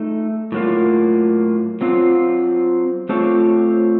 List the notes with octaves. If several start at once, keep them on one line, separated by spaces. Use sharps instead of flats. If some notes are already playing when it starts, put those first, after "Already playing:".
Already playing: A3 D#4 A4
A2 F#3 A#3 F4
F#3 C4 F4
A3 C4 F4 A4 C#5